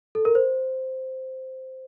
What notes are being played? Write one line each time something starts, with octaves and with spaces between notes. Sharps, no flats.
A4
A#4
C5